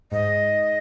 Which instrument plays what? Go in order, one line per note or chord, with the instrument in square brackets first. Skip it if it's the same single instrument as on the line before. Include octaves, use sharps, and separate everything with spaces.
[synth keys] G#2 [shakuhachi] D#5